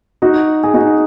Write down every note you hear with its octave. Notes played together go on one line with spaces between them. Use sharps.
D#4 F#4
G#4
D#4 F#4